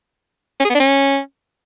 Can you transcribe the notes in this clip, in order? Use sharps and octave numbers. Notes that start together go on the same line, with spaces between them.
C#4
G#4
B3
D4
C#4